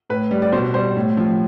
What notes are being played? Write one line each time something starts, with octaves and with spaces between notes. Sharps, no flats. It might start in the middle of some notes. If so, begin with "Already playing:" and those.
A2 B4
G3
D5
B2 C5
G3 C5
A2
F3